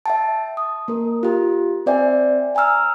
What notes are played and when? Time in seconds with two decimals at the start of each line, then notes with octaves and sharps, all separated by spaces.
0.06 E5 G5 A5
0.57 D#6
0.88 A#3 A#4
1.23 F4 G4
1.86 C4 C5 D5 E5 G5 G#5
2.55 G5 G#5 A#5 E6 F6